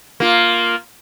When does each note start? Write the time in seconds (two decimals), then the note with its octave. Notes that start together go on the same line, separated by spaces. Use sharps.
0.20 A#3 F4